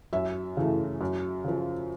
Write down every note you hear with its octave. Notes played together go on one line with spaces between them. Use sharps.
F#2 E5
C#3 E3 A3
F#2
C#3 F3